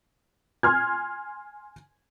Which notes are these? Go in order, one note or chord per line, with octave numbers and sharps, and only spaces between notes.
G#5 C6 F6 G#6